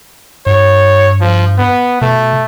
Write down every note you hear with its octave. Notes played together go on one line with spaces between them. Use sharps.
G2 C#5
F3
B3
B2 A3